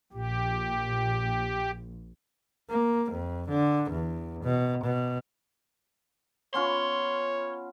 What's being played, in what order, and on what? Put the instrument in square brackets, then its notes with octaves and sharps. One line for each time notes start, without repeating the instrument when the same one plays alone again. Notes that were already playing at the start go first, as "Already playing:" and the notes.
[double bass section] A#1 [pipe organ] G4
[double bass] A#3
F2
D3
E2
B2
B2
[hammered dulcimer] B3 C#4 F4 [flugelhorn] C#5 [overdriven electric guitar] C6